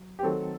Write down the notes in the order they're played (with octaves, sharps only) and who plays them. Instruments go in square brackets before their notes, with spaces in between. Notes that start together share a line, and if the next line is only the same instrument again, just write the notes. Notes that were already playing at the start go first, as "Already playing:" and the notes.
Already playing: [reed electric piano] F#3
[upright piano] G4
[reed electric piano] D#3 F#3 A3 C4 [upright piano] A4